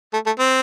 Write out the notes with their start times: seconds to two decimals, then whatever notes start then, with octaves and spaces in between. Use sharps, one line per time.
0.13 A3
0.26 A3
0.39 C4